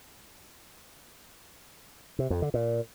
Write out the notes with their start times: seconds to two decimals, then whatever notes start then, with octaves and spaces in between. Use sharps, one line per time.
2.19 C3
2.30 F2
2.42 D3
2.54 A#2